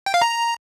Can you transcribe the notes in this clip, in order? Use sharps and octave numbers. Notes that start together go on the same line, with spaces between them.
G5
F5
A#5